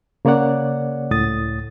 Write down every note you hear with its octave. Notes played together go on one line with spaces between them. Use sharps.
C#3 A#3 C#5 D5 F#5
C#2 A2 D#6 A6